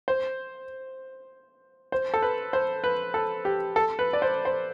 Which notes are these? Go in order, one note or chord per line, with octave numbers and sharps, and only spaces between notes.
C5
C5
A4
B4
C5
B4
A4
G4
A4
B4
D5
C5
C5